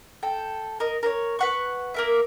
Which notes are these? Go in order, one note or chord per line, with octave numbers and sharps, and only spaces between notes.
A4 G5
A#4 D#5
A#4 C5 C#5
B4 F#5 C#6
A#3 A#4 E5